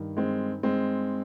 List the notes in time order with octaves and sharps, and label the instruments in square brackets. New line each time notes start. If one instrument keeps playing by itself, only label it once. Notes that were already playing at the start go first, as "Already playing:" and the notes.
Already playing: [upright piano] G2 D#3
G#3 C4
G#3 C4